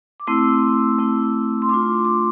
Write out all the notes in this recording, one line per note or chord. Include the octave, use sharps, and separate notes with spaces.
D6
A3 C4 E4 E6
A3 C4 E4
C6
A3 D4 F4 D6
D6